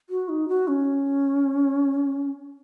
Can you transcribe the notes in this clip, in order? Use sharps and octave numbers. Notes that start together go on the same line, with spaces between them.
F#4
D#4
F#4
C#4